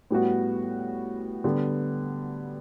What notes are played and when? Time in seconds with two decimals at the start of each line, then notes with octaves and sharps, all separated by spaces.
0.11 A2 G3 B3 F#4
1.44 D3 G3 B3